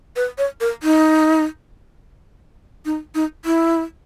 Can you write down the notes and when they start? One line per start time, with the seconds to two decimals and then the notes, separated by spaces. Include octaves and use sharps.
0.16 B4
0.38 C#5
0.61 A#4
0.83 D#4
2.86 D#4
3.15 D#4
3.45 E4